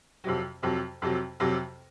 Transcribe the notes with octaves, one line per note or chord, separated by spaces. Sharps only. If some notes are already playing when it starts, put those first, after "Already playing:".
F2 C3 F#3
F2 C3 F#3
F2 C3 F#3
F2 C3 F#3